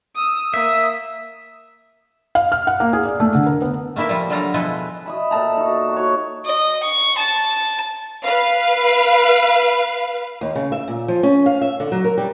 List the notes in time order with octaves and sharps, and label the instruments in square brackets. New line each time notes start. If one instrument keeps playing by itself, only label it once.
[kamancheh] D#6 E6
[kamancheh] A#3 D#6 [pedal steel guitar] E5
[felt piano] F5
F6
F#5
A#3
G#4
D5
A3
D3
A#4
B3
[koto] A3 A#3 E4 A#4 E5
F3 G3
D3 F#3 G3 A4 F5 A#5
B2 F3 G#3 E4 A4 B4
[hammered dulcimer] D#5 E5 B5
A#2 A4 A5 A#5
D#4 F#4
F#4 C#5
[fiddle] D#5
C#6
A5
[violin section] B4 F5
[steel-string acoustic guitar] D#2
C#3
E5
A#2
F3
C#4
F5
E5
D3
F#3
A#4
G3